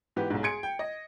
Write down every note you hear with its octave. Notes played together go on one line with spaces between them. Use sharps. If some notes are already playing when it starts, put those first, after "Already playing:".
G#2 E3 B3 G4
B1 G#2
G#4 C6 G#6 C#7 D7
G5
D#5